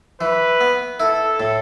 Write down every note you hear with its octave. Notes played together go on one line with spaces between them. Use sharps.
E3 B4
B3
E4 A4
A2